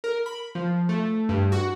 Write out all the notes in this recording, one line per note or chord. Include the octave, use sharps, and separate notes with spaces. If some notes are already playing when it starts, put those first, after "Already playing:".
A#4
B5
F3
A3
G2
F#4